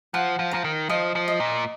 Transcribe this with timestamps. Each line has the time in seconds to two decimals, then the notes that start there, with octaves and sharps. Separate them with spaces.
0.14 F3 F#5
0.39 F3
0.51 F3 A#5
0.64 D#3
0.89 F3 D#5
1.15 F3
1.28 D#5
1.40 A#2